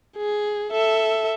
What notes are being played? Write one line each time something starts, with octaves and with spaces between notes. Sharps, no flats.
G#4
A4 E5